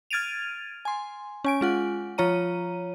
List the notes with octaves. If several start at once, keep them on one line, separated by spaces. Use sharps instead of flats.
F6 G#6 A6 D7 D#7 F7
G#5 C6
C#4 G#5 D7
G#3 F4 F#5
F3 F4 C#5 A#5 D#7